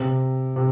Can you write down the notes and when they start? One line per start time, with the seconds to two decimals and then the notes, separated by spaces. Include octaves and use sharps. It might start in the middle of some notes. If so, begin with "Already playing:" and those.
Already playing: C3
0.56 C3